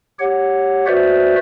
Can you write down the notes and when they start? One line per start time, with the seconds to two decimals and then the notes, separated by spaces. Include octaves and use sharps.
0.19 G4 C#5 F#5
0.87 F#4 B4 C5 D5 E5